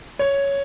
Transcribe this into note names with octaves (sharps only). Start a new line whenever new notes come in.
C#5